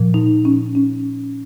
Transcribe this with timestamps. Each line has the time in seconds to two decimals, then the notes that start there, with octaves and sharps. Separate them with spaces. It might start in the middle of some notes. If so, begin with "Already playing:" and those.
Already playing: A#2 F3
0.14 D#4
0.45 C#4
0.75 C#4